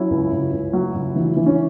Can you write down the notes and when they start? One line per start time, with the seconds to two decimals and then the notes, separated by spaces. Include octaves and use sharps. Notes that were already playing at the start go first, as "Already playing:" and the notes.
Already playing: F#3 C#4 E4
0.10 C#2
0.32 C#2
0.52 C#2
0.73 F#3
0.95 C#2
1.15 E3
1.36 E3
1.46 C#4